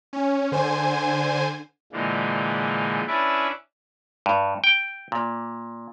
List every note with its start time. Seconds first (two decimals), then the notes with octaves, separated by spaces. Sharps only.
0.13 C#4
0.52 D3 C5 G#5
1.92 A#2 D3 E3 F3 G#3
3.07 C#4 D4 E4 B4 D5 E5
4.26 G2
4.64 G5
5.12 A#2